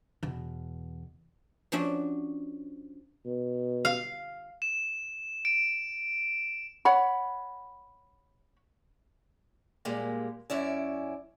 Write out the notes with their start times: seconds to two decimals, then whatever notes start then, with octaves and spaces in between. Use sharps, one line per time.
0.23 E2 B2
1.72 F3 C#4 D4 F#4 E5
3.25 B2
3.85 F5
4.62 E7
5.45 D7
6.85 C#5 F#5 B5
9.85 A#2 G3 G#3 A#3
10.50 F#2 C#4 E4 D5